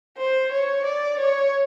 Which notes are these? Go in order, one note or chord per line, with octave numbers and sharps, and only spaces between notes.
C5
C#5
D5
C#5